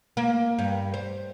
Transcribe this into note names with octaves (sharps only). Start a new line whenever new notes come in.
A#3
G2
C5